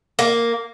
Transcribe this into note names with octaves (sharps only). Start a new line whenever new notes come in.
A#3